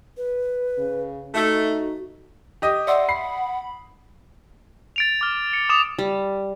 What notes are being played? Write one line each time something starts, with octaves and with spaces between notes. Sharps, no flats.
B4
C#3
A3 D#4 F#4
G4 D#5 D#6
D5 E5 F#5 C6
B5 C7
A6 D7 F7
D6 F6
C#7
D6 D#6 E7 F7
G3